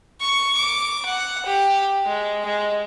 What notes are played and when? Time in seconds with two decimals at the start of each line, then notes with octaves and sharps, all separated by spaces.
0.21 C#6
0.57 D6
1.06 F#5
1.46 G4
2.06 G#3
2.45 G#3